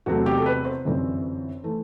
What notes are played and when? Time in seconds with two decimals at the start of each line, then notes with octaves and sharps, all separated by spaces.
0.06 E2 C3 F#3 A3 C4 F#4
0.26 G4
0.37 A4
0.46 B4
0.65 C5
0.85 G1 F#2 E3 G3 C4
1.64 E3 A3